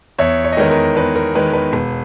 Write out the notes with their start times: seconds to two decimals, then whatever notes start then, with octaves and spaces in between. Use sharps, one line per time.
0.18 E2 C#5 E5
0.44 C#5
0.52 D#5
0.57 D#3 G#3 B3 A#4 C#5
0.70 A#4
0.96 E2 B4
1.15 A#4
1.35 D#3 G#3 B3 B4
1.54 B4
1.73 E1